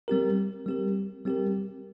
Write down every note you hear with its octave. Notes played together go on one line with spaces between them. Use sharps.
G3 C4 G4 A#4
G3 C4 G4 A#4
G3 C4 G4 A#4